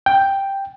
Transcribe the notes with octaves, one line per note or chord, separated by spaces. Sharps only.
G5